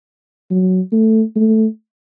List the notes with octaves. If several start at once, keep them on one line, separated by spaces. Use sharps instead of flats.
F#3
A3
A3